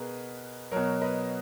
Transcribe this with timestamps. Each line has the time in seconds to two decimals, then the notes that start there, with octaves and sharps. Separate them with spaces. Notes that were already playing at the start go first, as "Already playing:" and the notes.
Already playing: B2 G#4 A#4 B4
0.71 B2 F#3 A#4 C#5
1.02 B4 D#5